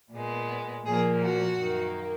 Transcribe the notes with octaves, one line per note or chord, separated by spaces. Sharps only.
A#2 G#3 B3
A#2 F3 A#3 G#4
F#4
F#2 D#3 A#3